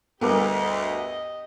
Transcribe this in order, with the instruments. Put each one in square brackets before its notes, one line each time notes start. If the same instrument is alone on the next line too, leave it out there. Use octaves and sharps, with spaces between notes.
[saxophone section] D2 [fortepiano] G2 A#4 D6 [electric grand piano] B3 [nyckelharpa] G4 D#5